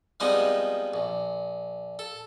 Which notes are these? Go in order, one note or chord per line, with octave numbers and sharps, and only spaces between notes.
F3 G3 G#3 B3 C4 D#4
A#1
A4